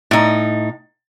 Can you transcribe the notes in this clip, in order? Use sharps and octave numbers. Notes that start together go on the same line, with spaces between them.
A2 D#4